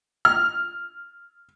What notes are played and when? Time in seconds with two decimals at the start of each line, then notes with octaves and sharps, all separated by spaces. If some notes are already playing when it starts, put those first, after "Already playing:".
0.25 F6